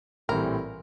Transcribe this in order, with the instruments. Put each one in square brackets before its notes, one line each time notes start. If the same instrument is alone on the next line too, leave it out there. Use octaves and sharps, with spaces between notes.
[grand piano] A#1 A2 E3 G3 C4 [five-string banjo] A#4